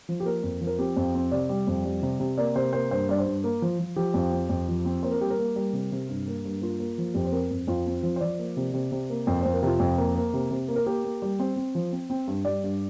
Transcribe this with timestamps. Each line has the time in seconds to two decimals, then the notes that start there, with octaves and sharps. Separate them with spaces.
0.09 F3
0.20 G4
0.25 A#3 A#4
0.43 F2
0.61 F3
0.67 A#4
0.79 C4 G4
0.96 F2
1.15 C4
1.32 C3 D5
1.49 G3
1.67 F2
1.85 G3
2.02 C3
2.20 C3
2.38 A#3 D5
2.56 C3 C5
2.73 A#3 C5
2.91 G2 C5
3.09 G2 D5
3.18 C5
3.26 G2
3.44 A#3
3.62 F3
3.79 F3
3.96 F3 G4
4.14 F2
4.32 C4
4.49 F2
4.68 F3
4.85 C4
5.02 A#3 C5
5.12 A#4
5.21 G3 G4
5.30 A#4
5.39 A#3
5.56 G3
5.73 C3
5.92 C3
6.09 G2
6.27 A#3
6.45 G2
6.62 A#3 F4
6.79 A#3
6.98 F3
7.15 F2 G4
7.25 C5
7.32 C4 A#4
7.50 F2
7.68 F2 F4
7.86 C4
8.03 F3
8.16 C5
8.21 F3 D5
8.39 A#3
8.57 C3
8.74 C3
8.92 C3
9.10 A#3
9.27 F2 C5
9.41 F2 C5
9.54 A#4
9.62 C3 F4
9.80 F2
9.98 A#3
10.16 A#3
10.34 C3
10.51 C3
10.68 A#3
10.76 A#4
10.86 A#3 G4
11.05 A#3
11.22 G3
11.39 C4 C5
11.56 C4
11.75 F3
11.92 C4
12.10 C4
12.28 G2
12.45 G3 D5
12.64 G2